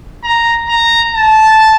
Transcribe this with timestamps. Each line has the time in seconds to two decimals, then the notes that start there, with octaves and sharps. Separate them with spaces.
0.24 A#5
0.69 A#5
1.14 A5